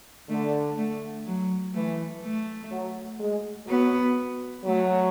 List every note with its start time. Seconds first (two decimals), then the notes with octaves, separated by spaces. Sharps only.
0.29 D3 A3
0.77 A3
1.26 F#3
1.74 E3 A3
2.23 A3
2.71 F#3
3.20 G#3
3.68 F#3 B3
4.65 F#3 A3